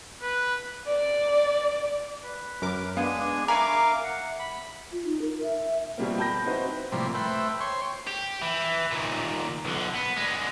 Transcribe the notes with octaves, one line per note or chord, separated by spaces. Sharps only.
B4
D5
B4
F#2 A#4 D6
G#3 B3 D4 G#4 F5 G#5
A#4 E5 F5 G#5 A#5 B5 C#6 D6
F#5
B5
F4
D#4
A#4
E5
B2 F3 G3 G#3 A#3 C4
G5 A5 B5 G6 A#6
C4 D#4 E4 F#4 B4 C5
A2 C3 F3 G3 A#3
A3 B4 C5 E5 G5
C5 C#5 G5 C6 C#6
G4
E3
D#2 A#2
B1 D3
B3
D3 G#3